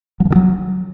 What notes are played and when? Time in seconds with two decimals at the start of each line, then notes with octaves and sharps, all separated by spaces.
0.20 F#3
0.25 F3
0.30 D#3
0.36 F#3